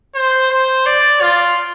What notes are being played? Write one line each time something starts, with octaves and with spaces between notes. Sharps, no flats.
C5
C5
D5
F4